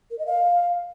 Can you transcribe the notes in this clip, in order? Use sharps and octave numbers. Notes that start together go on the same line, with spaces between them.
A#4
D#5
F5